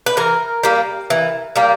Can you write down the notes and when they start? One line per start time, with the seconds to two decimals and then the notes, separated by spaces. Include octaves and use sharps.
0.06 B4
0.17 E3 A#4
0.63 G3 A#3
1.10 E3
1.56 G3 A#3